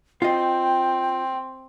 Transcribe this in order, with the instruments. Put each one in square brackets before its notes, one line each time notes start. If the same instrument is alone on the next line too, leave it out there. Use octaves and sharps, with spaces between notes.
[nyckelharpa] C4 [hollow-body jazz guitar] F4 D#5 [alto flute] G5